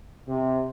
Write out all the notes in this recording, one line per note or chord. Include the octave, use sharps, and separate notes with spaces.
C3